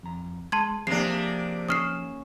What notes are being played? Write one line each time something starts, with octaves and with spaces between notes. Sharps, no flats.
F2 A#5
G#3 A5 C6 G#6
C3 F3 A#3 D4 G#4 C7
C#4 D#6 F6 C7 E7